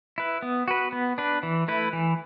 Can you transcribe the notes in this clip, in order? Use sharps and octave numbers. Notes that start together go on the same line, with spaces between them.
E4 B4
B3
F#4 B4
B3
D4 B4
E3
A3 E4 B4
E3